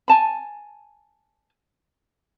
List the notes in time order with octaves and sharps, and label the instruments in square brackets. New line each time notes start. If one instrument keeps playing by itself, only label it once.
[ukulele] G#5 A5 B5